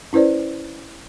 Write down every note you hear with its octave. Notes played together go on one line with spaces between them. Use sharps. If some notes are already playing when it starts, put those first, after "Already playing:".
C#4 E4 B4 C5 D5